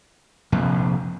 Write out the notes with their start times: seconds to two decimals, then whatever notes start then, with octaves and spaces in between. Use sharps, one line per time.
0.52 F1 A#1 F2